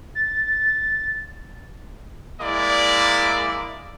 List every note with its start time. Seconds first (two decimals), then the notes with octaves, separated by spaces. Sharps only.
0.15 A6
2.40 G#3 A#3 E4 D5